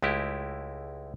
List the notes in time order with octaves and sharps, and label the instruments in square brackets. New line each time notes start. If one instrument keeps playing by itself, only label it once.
[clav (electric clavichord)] C#2 G#3 A3 E4 G4